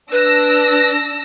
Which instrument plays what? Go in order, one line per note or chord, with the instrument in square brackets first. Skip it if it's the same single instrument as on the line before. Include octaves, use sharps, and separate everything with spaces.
[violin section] D4 E6 A#6 [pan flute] B4